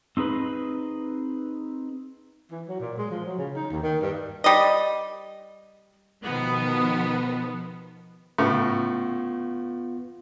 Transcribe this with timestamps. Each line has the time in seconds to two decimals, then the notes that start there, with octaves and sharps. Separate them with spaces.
0.17 C4 D#4 G#4 B4
2.51 E3
2.68 F#3
2.80 A#2
2.98 G#3
3.11 F3
3.26 F#3
3.38 C#3
3.55 D#4
3.71 D#2
3.83 D#3
4.01 G2
4.44 G3 D#5
6.24 B2 D#3 F3 B3
8.38 A2 C#3 B3 F4